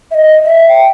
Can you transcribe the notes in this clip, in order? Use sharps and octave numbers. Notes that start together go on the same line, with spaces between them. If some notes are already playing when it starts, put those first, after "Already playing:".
E5
D#5
E5
G5